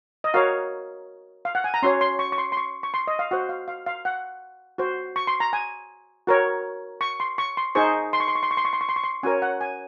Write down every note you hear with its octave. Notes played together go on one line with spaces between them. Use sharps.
D#5
F#4 A#4 C#5 F5
F5
F#5
G#5
A#5
C#4 F#4 C#5 C6
C6
C#6
C#6
C6
C6
C#6
C#6
C6
D#5
F5
F#4 C5 F#5
F5
F5
F5
F#5
F#4 C5
C#6
C6
A#5
G#5
F#4 A#4 C#5
C#6
C6
C#6
C6
D#4 G#4 C5 C#6
C6
C#6
C6
C#6
C6
C#6
C6
C#6
C6
C#6
C6
C#6
C6
C#4 F#4 A#4 C#5 G#5
F#5
G#5